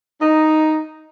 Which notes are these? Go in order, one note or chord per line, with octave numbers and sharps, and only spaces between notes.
D#4